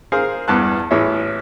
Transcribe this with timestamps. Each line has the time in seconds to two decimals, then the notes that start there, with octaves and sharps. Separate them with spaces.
0.12 G#4 A#4 C5 F5
0.48 E2 G2 A5 F#6
0.91 A1 E3 G#4 C#5 E5